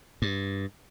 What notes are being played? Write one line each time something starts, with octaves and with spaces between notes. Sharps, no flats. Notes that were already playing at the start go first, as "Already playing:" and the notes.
G2